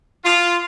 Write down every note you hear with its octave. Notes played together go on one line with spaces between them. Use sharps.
F4